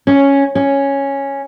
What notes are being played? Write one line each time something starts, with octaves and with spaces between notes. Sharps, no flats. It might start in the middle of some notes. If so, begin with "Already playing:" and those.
C#4
C#4